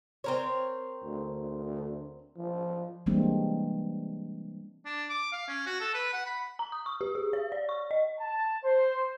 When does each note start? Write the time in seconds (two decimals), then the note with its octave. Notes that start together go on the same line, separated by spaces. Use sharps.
0.24 C4 A#4 C#5
1.04 D2
2.37 F3
3.06 E3 G3 G#3 A#3 C4 D4
4.85 D4
5.09 D6
5.32 F5
5.48 C#4
5.66 F#4
5.81 A4
5.94 B4
6.13 F#5
6.26 B5
6.59 A#5
6.72 D#6
6.86 C#6
7.01 G4
7.15 G#4
7.33 C#5
7.52 D5
7.69 C#6
7.91 D#5
8.20 A5
8.64 C5